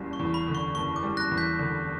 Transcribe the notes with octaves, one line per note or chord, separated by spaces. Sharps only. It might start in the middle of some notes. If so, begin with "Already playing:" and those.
Already playing: F#1 E2 G3
C#6
E2
B5
D3
C#6
F#1 C#6
D6
G3
F#6 A#6
E2
G6 B6
D3